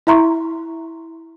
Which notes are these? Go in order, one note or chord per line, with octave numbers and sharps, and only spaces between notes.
E4 E5 A#5 C6 C#6